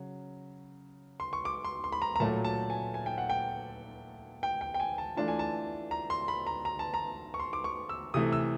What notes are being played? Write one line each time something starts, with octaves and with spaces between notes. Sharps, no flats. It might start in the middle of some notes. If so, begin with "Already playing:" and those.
Already playing: C#3 F#3
C6
C#6
D6
C6
C6
B5
A#5
A#5
A#2 F#3 A3 A5
A5
G#5
G#5
G5
F#5
G5
G5
G5
G5
G#5
A5
E3 A3 D4 F4 A5
G#5
A5
A#5
C6
B5
A#5
A#5
A5
A#5
C#6
C6
D6
C#6
E6
C3 E3 A3 D#6
E6